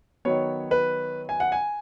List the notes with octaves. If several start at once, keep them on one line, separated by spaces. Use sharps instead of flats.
D#3 F#3 B3 C#5
B4
G#5
F#5
G#5